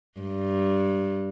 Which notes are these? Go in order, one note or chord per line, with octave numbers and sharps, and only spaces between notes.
G2